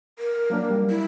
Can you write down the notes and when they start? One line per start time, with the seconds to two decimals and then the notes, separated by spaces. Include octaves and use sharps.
0.19 A#4
0.50 F#3 A#3 D4
0.70 G3
0.90 E4